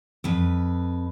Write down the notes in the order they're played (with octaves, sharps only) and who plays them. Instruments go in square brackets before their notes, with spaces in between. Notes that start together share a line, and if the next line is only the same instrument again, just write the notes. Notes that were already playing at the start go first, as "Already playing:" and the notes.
[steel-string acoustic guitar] F2 B4